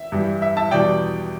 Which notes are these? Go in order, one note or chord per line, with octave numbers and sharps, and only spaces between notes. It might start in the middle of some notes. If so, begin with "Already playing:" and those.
Already playing: E5
G2 E3 G3
E5
E5 A5
E2 B2 G3 D5 G5